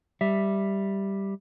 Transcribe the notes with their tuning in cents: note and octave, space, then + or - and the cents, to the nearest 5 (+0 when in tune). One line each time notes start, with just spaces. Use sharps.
G3 +0 E5 +0